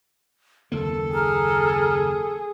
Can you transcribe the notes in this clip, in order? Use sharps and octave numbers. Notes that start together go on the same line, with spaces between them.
F#1 D#2 A#3 A4
G#4 A#5 F6